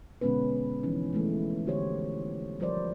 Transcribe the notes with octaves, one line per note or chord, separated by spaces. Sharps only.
B2 D3 G#3 B3 C#4 B4
E3 F3 G3 C4 C#4 D#4
E3 G#3 A3
D3 F#4 G4 C5 C#5
F3 G3 A#4 C5 D5